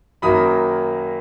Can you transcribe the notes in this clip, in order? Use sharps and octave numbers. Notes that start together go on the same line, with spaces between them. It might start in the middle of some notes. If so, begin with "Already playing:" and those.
F#2 D#3 F#3 A#3 B5 D#6